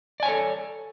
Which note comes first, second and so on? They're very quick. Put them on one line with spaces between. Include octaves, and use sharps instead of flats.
D5 G#5 C#5 A4